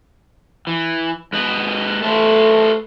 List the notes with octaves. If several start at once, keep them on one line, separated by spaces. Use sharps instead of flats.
E3
G#2 B4 D#5
A3 A4 B4 C5